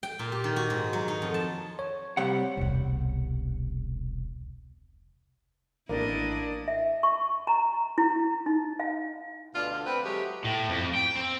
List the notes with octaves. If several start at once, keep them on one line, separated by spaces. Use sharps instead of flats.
G5
A#2
G4
D#3
F#4
G#2
F#3
D#4
F2
A5
C#5
C3 G3 F#5
E1 C2
A1 A#3 D4 E4 D#5
E5
C#6
A#5
E4
D#4
F5
D2 B2 D4 F4
D3
C4 B4
F#3 G#3 A3 G4
A2
F2
G5
C4